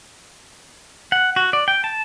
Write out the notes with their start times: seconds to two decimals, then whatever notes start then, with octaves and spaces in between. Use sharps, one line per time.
1.12 F#5
1.36 F#4
1.53 D5
1.68 G5
1.84 A5